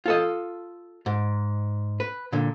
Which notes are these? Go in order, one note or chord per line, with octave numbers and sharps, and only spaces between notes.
F4 A4 D#5
G#2
B4
A#2 D3